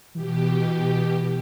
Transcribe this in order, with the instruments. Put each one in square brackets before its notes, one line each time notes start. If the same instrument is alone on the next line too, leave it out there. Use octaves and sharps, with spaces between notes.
[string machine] B2 G4 [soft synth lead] E3